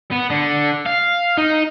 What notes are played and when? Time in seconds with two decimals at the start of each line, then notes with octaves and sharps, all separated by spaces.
0.11 B3
0.30 D3
0.86 F5
1.37 D#4